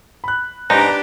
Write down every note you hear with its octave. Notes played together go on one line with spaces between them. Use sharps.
B5 F#6
G#2 D4 D#4 G4 B4 D5 A#5